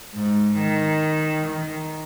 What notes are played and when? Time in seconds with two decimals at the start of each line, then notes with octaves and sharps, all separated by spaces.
0.13 G#2
0.58 D#3
1.47 D#3